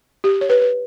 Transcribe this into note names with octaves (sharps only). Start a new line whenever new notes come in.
G4
C#5
B4
B4